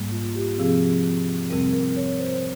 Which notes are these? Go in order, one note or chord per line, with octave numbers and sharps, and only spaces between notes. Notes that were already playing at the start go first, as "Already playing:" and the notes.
Already playing: G#2 G3 A#3
F4
G4
C3 F3 C4 G#4
F2 C3 G3 C4 A#4
A#4
C#5
C5